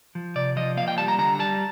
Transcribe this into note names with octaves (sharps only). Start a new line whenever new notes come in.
F3
C3 D5
F3 D#5
A#3 F5
G5
G3 A5
A#5
D3 A#5
G3 A5